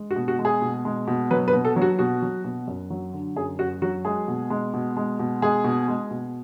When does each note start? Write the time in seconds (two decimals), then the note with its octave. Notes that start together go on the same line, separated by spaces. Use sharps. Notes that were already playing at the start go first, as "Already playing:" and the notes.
Already playing: G#3
0.11 F#4
0.16 B2
0.28 F#4
0.39 G#3
0.45 G#4
0.62 B2
0.85 G#3
1.07 B2
1.31 F#3 B4
1.48 B4
1.53 B2
1.65 A4
1.76 F#3
1.82 F#4
1.99 B2 F#4
2.22 F#3
2.44 B2
2.67 F#2
2.90 F#3
3.13 D3
3.36 F#2 G#4
3.59 F#2 F#4
3.82 F#3 F#4
4.05 G#3 G#4
4.28 B2
4.50 G#3
4.74 B2
4.97 G#3
5.19 B2
5.42 G#3 G#4
5.64 B2
5.88 G#3
6.11 B2